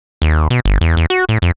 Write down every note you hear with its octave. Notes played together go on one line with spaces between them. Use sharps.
D#2
B2
G1
E2
E2
F#4
A2
F2